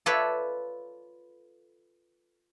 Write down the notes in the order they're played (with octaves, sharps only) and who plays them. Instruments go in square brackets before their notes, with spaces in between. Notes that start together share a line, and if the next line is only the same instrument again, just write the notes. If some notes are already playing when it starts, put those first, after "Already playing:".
[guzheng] F4 A4 B4 C#5 D5 E5